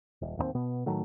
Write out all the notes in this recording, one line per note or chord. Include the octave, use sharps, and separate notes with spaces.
D#1
D1 D#2 F3 C4
B2 B3
A2 D#3 F#3 A3